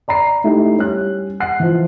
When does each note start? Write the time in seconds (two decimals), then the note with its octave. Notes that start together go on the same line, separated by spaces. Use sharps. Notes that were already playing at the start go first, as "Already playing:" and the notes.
0.08 D5 A#5 B5 C7
0.44 A3 D#4 E4 G4
0.77 G3 C#4 F#6
1.40 F#5 F#6 C7
1.60 E3 F3